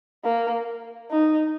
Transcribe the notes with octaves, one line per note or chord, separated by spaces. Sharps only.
A#3
D#4